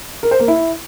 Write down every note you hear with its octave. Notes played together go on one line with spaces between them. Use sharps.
A#4
C5
A#3
E4